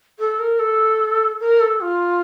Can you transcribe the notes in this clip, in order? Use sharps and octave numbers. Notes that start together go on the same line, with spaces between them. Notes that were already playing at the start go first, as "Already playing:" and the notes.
A4
A#4
A4
A#4
A4
F4